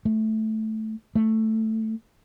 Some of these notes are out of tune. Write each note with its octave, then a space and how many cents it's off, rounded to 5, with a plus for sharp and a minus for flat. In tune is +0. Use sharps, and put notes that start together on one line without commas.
A3 -5
A3 +5